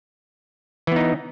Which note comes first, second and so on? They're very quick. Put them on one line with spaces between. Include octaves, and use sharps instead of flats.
E3 B3 D#4